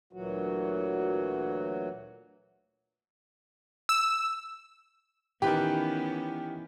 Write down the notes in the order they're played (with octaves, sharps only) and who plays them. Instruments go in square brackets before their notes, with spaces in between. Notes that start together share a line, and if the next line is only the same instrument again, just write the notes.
[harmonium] D2 A#2 E3 F#3 F#4
[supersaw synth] E6
[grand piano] D#3 G4 [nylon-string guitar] E3 B4 [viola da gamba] B3 C#4 E4 [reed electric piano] G5